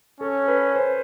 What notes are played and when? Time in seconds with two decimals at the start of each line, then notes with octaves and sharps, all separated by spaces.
0.20 C#4 A4
0.48 B4
0.76 C5